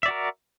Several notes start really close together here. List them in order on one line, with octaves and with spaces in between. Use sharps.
E5 D5 F#4 A#4